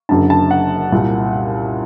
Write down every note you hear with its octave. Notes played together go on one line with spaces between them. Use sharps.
F#1 F#2 D3 A5
A5
F#5
C2 A#2